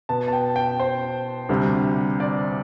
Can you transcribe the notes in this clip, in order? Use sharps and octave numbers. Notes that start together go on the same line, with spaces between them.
B2 B3 A5
A5
G5
G5
C5
D2 C3 G3
D5